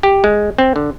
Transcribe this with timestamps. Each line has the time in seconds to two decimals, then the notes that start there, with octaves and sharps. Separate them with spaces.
0.03 G4
0.24 G#3
0.58 C4
0.76 D3